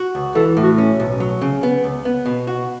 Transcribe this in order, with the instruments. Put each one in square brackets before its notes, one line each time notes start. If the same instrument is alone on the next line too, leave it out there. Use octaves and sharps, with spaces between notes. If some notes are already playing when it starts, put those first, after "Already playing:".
Already playing: [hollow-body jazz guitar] F#4
C#2
[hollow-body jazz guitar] E3 [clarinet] A4
[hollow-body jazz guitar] A2
[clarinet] F#4
[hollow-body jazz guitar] C#4
B1
F#3
C#3
B3
C#2
B3
B2
F#4